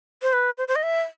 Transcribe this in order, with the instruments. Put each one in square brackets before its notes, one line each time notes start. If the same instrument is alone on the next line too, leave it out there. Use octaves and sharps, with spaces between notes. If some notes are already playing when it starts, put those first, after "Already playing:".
[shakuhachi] C5
B4
C5
C5
D#5
E5